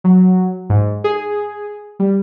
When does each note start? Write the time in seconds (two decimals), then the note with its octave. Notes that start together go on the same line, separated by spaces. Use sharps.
0.04 F#3
0.70 G#2
1.04 G#4
2.00 G3